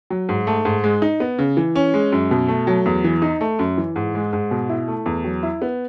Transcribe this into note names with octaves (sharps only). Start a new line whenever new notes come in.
F#3
G#2
A3
G#2
G#3
D#4
B3
C#3
E3
C#4
G#3
F#2
B2
A3
F#3
E2
E3
D#4
A3
F#2
E3
G#2
G#3
G#2
B2
E4
A3
E2
F#3
E4
B3